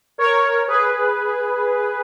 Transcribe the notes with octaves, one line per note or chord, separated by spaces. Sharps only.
A#4 C#5
G#4 B4